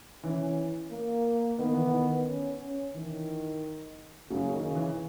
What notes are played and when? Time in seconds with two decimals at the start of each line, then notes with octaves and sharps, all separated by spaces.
0.23 E3 C#4
0.91 A#3
1.58 D#3 B3
1.73 E3
1.87 D#3
2.27 C#4
2.61 C#4
2.94 D#3 E3
4.30 F#2 C#3 F#3
4.53 D#3
4.64 C#3
4.75 E3